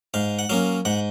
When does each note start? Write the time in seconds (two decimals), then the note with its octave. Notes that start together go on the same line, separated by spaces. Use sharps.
0.14 G#2 F5
0.39 F#5
0.49 F#3 A#3 C#4 F5
0.85 G#2 F#5